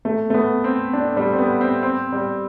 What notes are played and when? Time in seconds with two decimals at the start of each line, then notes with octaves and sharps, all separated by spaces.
0.05 A3
0.30 A3
0.34 B3
0.64 C4
0.93 D4
1.17 G3
1.32 C4
1.38 B3
1.61 C4
1.83 C4
2.12 G3